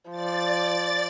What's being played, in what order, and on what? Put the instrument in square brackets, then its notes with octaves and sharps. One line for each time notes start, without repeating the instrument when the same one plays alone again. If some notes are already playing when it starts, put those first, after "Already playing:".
[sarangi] F3 [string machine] D5 A6